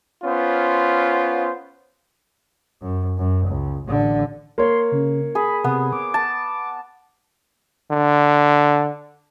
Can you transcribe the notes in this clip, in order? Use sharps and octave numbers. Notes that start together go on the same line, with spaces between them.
B3 C#4 F4 C5
F#2
F#2
C#2
A1 D3
A#3 C#5 C6
C#3
G#4 B5
C3 B3
D6
A5
D3